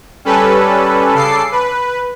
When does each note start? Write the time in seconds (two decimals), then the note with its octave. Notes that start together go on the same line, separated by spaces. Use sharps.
0.25 G3 C#4 A4 B4
1.14 C#3 A4 D6 C7
1.52 B4